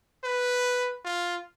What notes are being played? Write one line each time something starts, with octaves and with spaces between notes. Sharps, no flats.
B4
F4